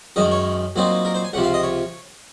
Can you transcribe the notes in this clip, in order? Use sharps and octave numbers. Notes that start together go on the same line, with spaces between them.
F#2 D#3 G#3 D#5
C#5
A#2 F#3 C4 D#4
A#4
C5
G#5
C#2 C3 F3 F#5
F5
D#5
C#5